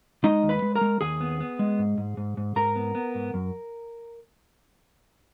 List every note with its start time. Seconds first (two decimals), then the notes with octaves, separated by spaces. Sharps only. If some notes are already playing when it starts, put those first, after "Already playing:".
0.24 G#3 D#4 D#5
0.43 D#2
0.49 B4 B5
0.62 G#3
0.75 A#4 A#5
0.81 G#3
1.01 D#2 G#4 G#5
1.21 B3
1.40 B3
1.59 G#3
1.79 G#2
1.98 G#2
2.17 G#2
2.37 G#2
2.56 G#2 A#4 A#5
2.76 B3
2.95 B3
3.15 G#2
3.34 F#2